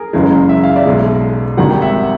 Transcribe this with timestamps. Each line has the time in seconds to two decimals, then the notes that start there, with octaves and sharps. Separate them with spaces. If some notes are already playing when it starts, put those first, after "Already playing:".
Already playing: G#4 A#4
0.13 F#1 F#2 C#3 E3 G#3
0.49 E5
0.64 F5
0.76 D5 E5
0.86 B1 B2 G#3
1.57 G#1 G#2 D#3 G3 F#5
1.69 G5
1.81 E5 F#5